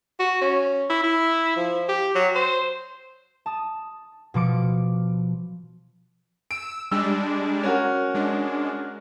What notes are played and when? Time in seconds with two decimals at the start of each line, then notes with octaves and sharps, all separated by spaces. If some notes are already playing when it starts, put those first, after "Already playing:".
0.19 F#4
0.41 C#4
0.90 E4
1.03 E4
1.56 F3
1.89 G4
2.15 F#3
2.35 C5
3.46 A5 D#6
4.34 B2 F3 D6 C#7
6.51 E6 D7
6.91 G3 G#3 D4 E6
7.63 C#4 F#4 A#4
8.14 G#3 D4